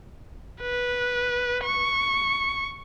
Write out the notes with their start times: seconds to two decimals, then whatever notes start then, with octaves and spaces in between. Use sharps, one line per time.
0.61 B4
1.64 C#6